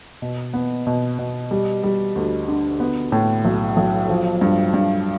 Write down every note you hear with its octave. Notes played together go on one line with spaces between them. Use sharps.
B2
B3
B2
B2
G3
G3
D2
D3
B3
A2
B1
B1
F3
G2
G2